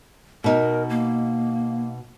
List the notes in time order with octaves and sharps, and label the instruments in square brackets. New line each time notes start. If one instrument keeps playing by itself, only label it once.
[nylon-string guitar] B2 D#4 [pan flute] A#4
[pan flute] A#3